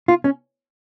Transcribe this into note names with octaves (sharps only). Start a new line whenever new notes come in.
F4
C#4